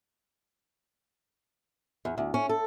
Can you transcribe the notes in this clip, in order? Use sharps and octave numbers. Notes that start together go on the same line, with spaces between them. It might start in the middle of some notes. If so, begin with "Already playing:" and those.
E2
D2
C#4
A4